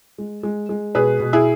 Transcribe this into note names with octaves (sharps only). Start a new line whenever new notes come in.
G#3
G#3
G#3
B2 G#4 B4
B2
E4 G#4